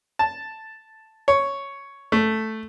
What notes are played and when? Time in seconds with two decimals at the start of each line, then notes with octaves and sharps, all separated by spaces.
0.19 A5
1.28 C#5
2.12 A3